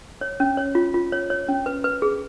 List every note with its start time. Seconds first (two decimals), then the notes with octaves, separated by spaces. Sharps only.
0.21 C#5
0.40 C#4
0.57 C#5
0.75 F4
0.94 F4
1.12 C#5
1.30 C#5
1.48 C#4
1.66 B4
1.84 B4
2.02 G#4